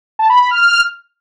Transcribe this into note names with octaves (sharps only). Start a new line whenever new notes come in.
A5
B5
B5
F6
F6